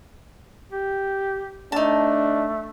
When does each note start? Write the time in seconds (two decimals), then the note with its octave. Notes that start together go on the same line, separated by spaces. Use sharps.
0.71 G4
1.72 A3 D4 D#4 A5